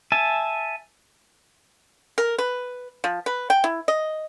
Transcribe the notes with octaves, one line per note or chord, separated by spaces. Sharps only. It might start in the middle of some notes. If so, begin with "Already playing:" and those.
E5 G#5 A5
A#4
B4
F3
B4
G5
E4
D#5